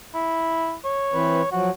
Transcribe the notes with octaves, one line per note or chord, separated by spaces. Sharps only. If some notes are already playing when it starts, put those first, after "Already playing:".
E4
C#5
E3 C4 B4
F3 F#3 F#4